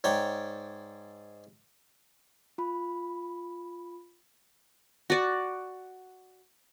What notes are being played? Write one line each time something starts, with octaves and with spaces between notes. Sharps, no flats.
G#2 C#5 D5 G5
F4 B5
F#4 D5